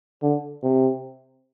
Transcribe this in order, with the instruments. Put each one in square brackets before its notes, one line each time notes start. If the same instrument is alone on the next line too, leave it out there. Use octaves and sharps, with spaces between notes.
[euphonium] D3
C3